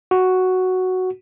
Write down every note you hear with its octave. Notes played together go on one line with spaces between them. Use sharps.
F#4